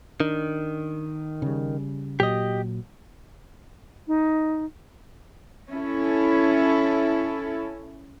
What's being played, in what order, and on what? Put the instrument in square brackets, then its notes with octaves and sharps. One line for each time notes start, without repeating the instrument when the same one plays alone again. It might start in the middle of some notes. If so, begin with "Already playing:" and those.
[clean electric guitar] D#3 [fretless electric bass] D4
[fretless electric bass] C#3 G3
[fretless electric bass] A#2 F#3 [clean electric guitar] G4 D#5
[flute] D#4
[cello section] C#4 E4 A4